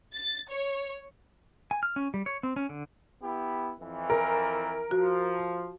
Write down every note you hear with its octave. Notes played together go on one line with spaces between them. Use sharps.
A6
C#5
G#5
F6
C#4
G3
C#5
C4
C#4
D3
B3 E4 G4
F2 E3
A#4
F3 F#4